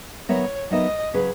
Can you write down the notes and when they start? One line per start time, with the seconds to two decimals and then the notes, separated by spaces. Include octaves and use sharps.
0.28 F#3 B3 D#4 A#4 C#5 E5
0.71 F#3 B3 D#4 A#4 D#5 E5
1.14 C#3 F#3 C#4 G#4 B4